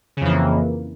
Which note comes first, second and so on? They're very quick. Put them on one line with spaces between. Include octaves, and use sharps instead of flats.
C#3 F2 E3 A#3